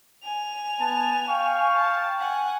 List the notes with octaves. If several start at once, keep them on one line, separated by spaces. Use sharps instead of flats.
G#5 F7
B3 A5
F5 G5 C#6
A5
F#5 G#5